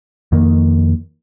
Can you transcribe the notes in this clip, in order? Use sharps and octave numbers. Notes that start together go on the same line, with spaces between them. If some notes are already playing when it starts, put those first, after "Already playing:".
F2 D#3 A#3